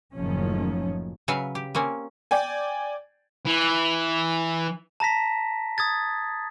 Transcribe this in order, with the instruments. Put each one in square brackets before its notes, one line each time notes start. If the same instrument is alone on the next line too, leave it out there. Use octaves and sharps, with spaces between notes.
[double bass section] F#1 A2 D#3 F3 C#4
[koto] C#3 F#3 B4 E5 F5
G4
A#3 C4 C#4
[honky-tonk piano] D5 G5 G#5
[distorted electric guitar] E3
[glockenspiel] A5 A#5 A#6 B6
D#6 G#6 A6